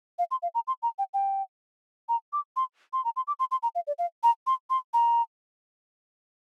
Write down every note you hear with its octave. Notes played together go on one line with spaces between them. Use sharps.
F5
C6
F5
A#5
C6
A#5
G5
G5
A#5
D6
C6
C6
A#5
C6
D6
C6
C6
A#5
F5
D5
F5
A#5
C6
C6
A#5